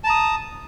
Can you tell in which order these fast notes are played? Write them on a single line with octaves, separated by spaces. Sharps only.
A5 A#5 D#6